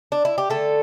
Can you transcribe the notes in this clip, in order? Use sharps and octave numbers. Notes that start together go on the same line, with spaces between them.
D4
E4
G4
D3 A3 A4